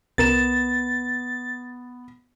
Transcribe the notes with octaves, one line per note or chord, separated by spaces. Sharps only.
C2 B3 A#4 A6 E7